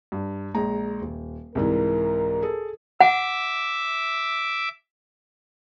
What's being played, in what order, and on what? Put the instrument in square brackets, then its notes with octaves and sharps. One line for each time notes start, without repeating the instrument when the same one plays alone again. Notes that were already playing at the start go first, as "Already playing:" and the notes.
[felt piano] G2
A#1 G#3 A#5
D#1
[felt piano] C2 G#2 E3 [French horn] A#4
[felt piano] G#4 A4
[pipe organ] E5 D6 [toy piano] F#5